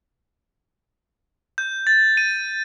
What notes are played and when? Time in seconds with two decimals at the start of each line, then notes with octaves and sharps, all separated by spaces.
1.58 G6
1.87 A6
2.17 D#7